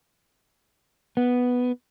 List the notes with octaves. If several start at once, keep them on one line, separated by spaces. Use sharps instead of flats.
B3